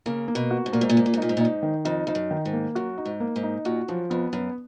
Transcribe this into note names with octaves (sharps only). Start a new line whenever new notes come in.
C#3 A#3
A#3
B2
F#4
G#2
A#2 A#3
G#2
A#2
G#2 A#3
A#2
G#2
A#2 D#4
G#2
A#2
G#2 D#4
D#3
F2 D#4
F2 D#4
F#2
D#3
G#2
A#3
F#2 F#4
D#4
G#2
A#3
G#2
D#4
A#2 F#4
F#2 F3
F2 B3
F#2 B3